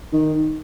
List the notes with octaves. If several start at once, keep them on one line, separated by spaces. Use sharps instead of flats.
D#3